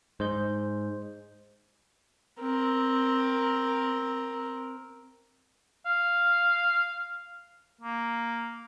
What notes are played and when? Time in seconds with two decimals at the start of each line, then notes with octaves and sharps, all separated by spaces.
0.20 G#2 C5 D#5 G6
2.40 C4 A#4
5.86 F5
7.81 A#3